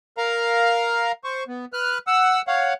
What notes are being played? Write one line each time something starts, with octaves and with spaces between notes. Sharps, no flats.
A#4 F5 A#5
C5 C#6
B3
B4 F6 F#6
F#5 E6
C#5 F5 F#5